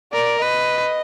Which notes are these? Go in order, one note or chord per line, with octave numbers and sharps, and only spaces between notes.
A#4 D5
B4 D#5